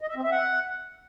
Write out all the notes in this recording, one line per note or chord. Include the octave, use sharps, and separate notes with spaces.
D#5
E5
C4
E5
F#5